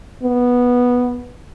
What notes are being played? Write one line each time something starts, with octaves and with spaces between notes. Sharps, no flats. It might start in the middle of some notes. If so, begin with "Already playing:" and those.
B3